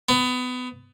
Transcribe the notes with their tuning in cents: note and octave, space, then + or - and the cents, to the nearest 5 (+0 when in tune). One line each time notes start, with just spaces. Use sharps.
B3 +25